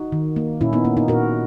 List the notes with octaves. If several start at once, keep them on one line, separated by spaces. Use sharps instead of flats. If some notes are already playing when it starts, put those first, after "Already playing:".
Already playing: D#4 F#4
D#3
A#3
A#2 C#4 E4
B3 D#4
A#3 C#4
B3 D#4
A#2 F#4 A#4